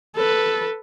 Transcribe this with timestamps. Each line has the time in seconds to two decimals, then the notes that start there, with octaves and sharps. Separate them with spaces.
0.16 A4 B4